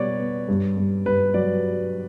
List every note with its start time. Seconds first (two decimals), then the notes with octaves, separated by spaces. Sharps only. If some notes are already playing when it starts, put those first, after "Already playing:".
Already playing: B2 G3 B3 B4 C#5 D5
0.19 B3
0.48 G2
0.77 G2
1.06 G2 B4
1.34 F#3 D5